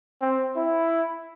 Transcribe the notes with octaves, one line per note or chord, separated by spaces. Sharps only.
C4
E4